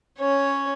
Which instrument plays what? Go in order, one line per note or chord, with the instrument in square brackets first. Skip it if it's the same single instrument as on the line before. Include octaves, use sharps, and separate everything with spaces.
[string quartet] C#4 C#5